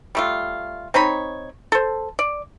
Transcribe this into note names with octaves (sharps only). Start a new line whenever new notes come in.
G3 A3 F4
C4 D#4 C#5 B5
A4 C5
D5